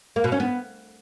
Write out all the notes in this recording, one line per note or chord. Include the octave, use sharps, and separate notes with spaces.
A#3
B2
C#4
B3